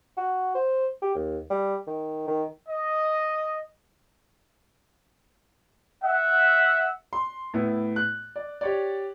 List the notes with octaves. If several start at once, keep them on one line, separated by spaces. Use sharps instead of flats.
F#4
C5
G4
D#2
G3
D#3
D#3
D#5
E5 F#5
C6
A2 B3 E4
F#6
D5
G4 C#5 D5